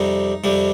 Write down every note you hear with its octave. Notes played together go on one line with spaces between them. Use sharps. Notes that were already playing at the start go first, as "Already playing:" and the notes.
Already playing: F2 C3 G3 D#4
F2 C3 G3